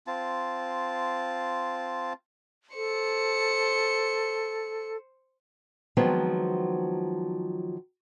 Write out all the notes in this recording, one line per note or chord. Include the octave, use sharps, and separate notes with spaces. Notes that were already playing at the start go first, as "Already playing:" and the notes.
C4 F4 A5
A4 C5 C#7
D#3 F3 F#3 G#3 B3 C4